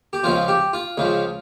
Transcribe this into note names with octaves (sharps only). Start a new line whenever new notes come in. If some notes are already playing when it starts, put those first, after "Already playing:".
G4
C#2 C#3 F3 F4
G4
F4
C#2 C#3 F3